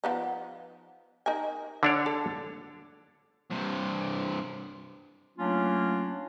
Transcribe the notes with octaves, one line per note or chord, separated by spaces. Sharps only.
F3 B3 D#4
D#4 A#4 G#5
D3 D4 C#5
A4
G2 C3
F#3 A3 A#3 C#4 D4 F4